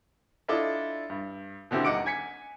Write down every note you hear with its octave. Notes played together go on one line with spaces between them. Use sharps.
D4 E4 F4 A4 D5 D#5
G2
B2 D3 C4 E4 G4
D#1 D#4 F#5 D6 D7
G#5 G#6 B6 C#7